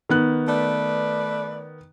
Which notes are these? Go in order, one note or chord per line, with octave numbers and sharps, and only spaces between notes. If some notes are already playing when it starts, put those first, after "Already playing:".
D#3 B3 F#6
A3 B4 D5